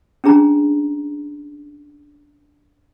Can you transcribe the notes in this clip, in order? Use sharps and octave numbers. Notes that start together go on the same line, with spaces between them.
C#4 D4 G#4 A#5